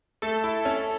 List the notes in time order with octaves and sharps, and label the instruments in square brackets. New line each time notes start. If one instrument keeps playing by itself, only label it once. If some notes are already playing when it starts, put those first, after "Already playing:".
[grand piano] A3 [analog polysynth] A4
[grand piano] E4
C#4